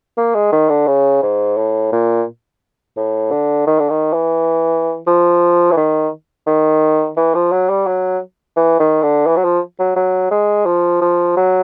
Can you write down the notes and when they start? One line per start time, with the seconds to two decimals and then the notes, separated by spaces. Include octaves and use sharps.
0.17 A#3
0.35 G#3
0.52 D#3
0.69 D3
0.87 C#3
1.23 G#2
1.57 A2
1.92 A#2
2.97 A2
3.31 D3
3.67 D#3
3.79 D3
3.90 D#3
4.13 E3
5.07 F3
5.71 E3
5.77 D#3
6.47 D#3
7.17 E3
7.35 F3
7.52 F#3
7.70 G3
7.87 F#3
8.57 E3
8.80 D#3
9.03 D3
9.27 E3
9.37 F#3
9.44 F3
9.79 F#3
9.96 F#3
10.31 G#3
10.66 F3
11.02 F3
11.37 F#3